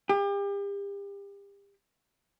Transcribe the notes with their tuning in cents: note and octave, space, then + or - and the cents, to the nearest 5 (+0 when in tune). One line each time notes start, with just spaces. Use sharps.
G4 +35